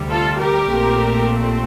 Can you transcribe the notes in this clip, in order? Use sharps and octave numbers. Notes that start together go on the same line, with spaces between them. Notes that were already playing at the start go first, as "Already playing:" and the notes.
Already playing: D2 C3 G3
F4 A4
G4 A#4
A#1 A#2 A3 C4